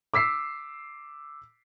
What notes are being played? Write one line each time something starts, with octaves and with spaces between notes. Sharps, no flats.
D6 E6 B6 C7